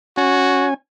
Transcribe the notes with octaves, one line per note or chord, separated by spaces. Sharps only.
C#4 F#4 G#5